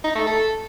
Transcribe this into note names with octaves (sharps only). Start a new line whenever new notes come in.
D#4
A3
A4